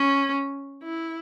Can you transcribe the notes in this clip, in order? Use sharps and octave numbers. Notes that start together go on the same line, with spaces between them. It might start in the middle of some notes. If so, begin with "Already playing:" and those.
Already playing: C#4
E4